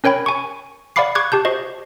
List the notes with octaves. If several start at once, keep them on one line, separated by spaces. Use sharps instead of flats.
C#4 A#4 C#5 G5 B5
G#5 C#6
D5 F5 F#5 B5 D6 C7
C#6 D6 F#6 G#6
G4 A5 G6
F#4 C5 D#5